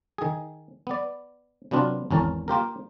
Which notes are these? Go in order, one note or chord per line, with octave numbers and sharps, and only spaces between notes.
D#3 G#4
B3 D5
C3 F#3 B3 D4 F4
G#1 E2 C#4 A#4 A5
A#3 F4 G4 A#4